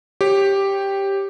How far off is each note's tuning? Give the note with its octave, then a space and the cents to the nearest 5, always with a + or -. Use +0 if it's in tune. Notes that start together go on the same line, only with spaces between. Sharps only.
G4 +0 C#5 -25 G5 +0